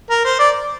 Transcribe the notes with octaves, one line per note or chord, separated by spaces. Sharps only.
A#4
C5
D5